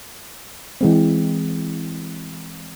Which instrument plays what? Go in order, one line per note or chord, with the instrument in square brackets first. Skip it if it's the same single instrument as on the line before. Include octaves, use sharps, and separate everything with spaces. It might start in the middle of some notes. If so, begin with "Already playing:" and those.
[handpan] E3 G#3 C4